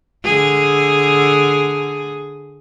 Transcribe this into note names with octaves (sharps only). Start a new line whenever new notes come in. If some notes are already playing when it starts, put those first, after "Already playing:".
D3 G#4